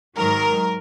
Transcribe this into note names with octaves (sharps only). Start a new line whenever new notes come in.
G#2 D#3 F#3 A#4